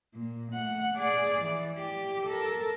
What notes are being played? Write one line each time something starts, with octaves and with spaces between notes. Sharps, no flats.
A#2
A3 F#5
G#4 D5
E3
G4
A4 A#4